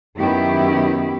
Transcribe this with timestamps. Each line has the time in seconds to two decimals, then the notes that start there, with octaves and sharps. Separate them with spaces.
0.15 F#2 D#3 B3 E4 G4